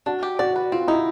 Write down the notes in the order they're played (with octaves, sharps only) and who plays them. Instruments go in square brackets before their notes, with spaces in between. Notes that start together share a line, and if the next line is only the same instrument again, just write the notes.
[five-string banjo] D4 [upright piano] F#4
[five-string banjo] G4
[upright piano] F#4 [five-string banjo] D5
[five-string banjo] B4
[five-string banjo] C4 [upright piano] F4
[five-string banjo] D#4 [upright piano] E4